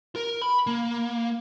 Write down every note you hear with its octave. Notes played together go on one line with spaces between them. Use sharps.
A#4
B5
A#3